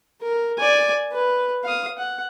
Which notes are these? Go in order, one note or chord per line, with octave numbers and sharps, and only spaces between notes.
A#4
D5 G#5
B4
F5 D#6
F#5